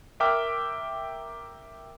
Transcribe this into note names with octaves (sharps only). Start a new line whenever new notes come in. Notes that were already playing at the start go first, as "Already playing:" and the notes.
A#4 E5 G5 D6 F6